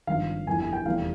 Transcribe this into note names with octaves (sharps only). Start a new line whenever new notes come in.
G#1 G2 F3 F5
G1 F2 E3 G3 G#5
G#5
G5
F1 E2 E3 G3 F5